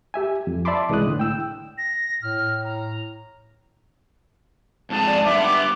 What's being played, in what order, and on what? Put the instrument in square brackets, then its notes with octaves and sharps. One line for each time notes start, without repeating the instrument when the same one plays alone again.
[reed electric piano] G4 E5 G#5
F2
D5 E5 A5 B5 C6 D6
C2 E3 G#3 E4 D#6 F#6
A2 D3
G5 E6
[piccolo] A#6
[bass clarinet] A2 [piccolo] F6
[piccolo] A#5
[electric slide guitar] F2 G#2 G#4 [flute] A5
[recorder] D5
[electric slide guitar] G2 B3 [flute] E5 [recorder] D6